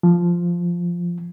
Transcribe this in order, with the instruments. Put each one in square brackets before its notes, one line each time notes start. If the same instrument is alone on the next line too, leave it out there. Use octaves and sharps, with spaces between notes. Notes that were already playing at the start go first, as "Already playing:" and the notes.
[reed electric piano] F3